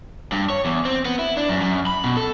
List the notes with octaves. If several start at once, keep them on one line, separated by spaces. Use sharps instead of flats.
G2
C#5
E2
C4
B3
E4
D4
F#2
F#2
B5
B2
A4